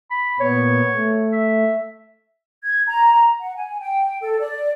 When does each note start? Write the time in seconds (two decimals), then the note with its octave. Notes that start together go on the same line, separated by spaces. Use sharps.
0.10 B5
0.40 A#2 B3 C#5
0.93 A3
1.32 E5
2.64 G#6
2.87 A#5
3.40 F#5
3.55 G#5
3.80 G5
4.21 A4
4.40 D5